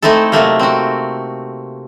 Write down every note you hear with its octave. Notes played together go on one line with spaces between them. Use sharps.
A3 C4 D#4 E4 A4
C3 F#3 A3 A#3
C4 F#4